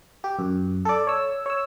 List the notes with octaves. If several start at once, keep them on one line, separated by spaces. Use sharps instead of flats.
G4
F#2
A4 D5
C#5 E6
C#5 E6